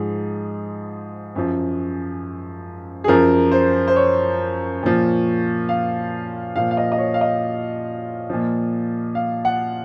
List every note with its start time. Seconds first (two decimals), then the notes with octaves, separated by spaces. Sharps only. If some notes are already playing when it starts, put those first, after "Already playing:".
Already playing: G#2 F3 G#4
1.35 F#2 F3
3.04 G#4
3.08 F#2 F3 A#4
3.51 C5
3.87 C5
3.96 C#5
4.83 A#2 F3
5.69 F5
6.56 A#2 F3 F5
6.71 F5
6.77 D#5
6.92 D#5
6.98 C#5
7.14 F5
7.21 D#5
8.30 A#2 F3
9.15 F5
9.45 F#5